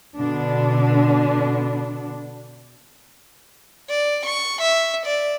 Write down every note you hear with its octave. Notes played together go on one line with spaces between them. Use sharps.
B2 D3 D4
D5
C#6
E5
D5